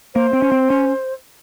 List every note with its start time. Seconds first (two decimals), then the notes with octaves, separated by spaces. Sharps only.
0.15 A#3 C5
0.33 C4
0.42 C#4
0.52 C4
0.70 C#4